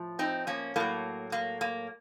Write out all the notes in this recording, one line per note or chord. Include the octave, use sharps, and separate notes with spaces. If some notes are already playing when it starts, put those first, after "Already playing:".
Already playing: A2 F3
C4 D#4
A#3 C#4
A2 F#3 A#3
A#3
A#3